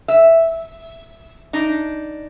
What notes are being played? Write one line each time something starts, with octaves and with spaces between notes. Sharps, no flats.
E5
D4 D#4